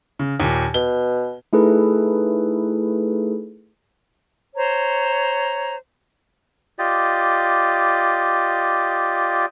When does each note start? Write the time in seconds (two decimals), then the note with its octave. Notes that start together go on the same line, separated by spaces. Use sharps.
0.19 C#3
0.40 D#2 A#2
0.74 B2 G7
1.53 A3 D#4 E4 G#4 A4 B4
4.56 C5 C#5 A#5
6.79 F4 G4 D5 D#5